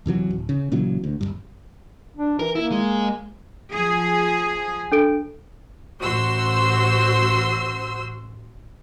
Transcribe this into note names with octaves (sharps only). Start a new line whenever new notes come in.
E2 C3 E3 F#3
D1
C#3
A#2 C#3 E3 F#3
D2
D#1 C2 G2
D4
E3 A#4
A#3 E4
G#3
F3 G#4
D4 A4 D7
A1 F#4 C5 C6 E6